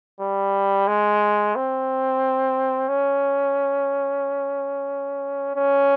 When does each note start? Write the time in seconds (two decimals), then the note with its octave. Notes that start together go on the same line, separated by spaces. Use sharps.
0.21 G3
0.88 G#3
1.56 C4
2.88 C#4
5.56 C#4